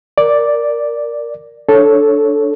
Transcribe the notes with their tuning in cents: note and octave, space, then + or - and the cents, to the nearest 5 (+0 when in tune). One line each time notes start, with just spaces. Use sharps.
A#4 +0 D5 +0
D4 +0 A4 -5 C#5 +0